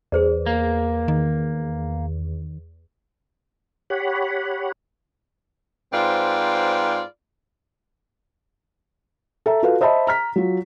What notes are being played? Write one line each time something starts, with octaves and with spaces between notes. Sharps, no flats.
E2 G#4 C5 D5
A#3
D#3
G4 C#5 F#5 B5
G#2 C4 F4 B4 D5
A4 E5 A#5
F4 F#4 A4 B4 F5
C5 D#5 E5 A5 B5
A#5 F6 B6
F#3 F4